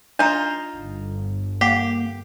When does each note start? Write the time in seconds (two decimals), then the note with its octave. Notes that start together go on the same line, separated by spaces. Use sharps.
0.19 D4 D#4 F4 A#5
0.75 G1
1.61 A#3 G4 F#5